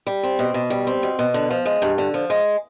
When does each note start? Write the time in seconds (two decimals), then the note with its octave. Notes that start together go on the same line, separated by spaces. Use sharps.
0.07 G3
0.23 C4
0.39 B2
0.54 B2
0.70 G3
0.87 C4
1.03 B2
1.19 B2
1.34 D3
1.50 F3
1.65 G#3
1.82 G2
1.98 D3
2.14 F3
2.30 G#3